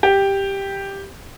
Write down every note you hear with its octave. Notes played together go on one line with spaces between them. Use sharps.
G4